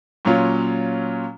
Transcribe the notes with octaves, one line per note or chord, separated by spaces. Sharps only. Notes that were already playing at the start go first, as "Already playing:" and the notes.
A#2 F#3 C#4 F4